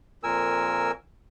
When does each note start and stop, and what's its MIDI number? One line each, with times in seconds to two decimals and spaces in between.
0.23 0.91 41
0.23 0.91 46
0.23 0.91 70
0.23 0.91 80
0.23 0.91 88